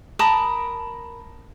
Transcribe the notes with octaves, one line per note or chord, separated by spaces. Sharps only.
A#4 A5 B5 D#6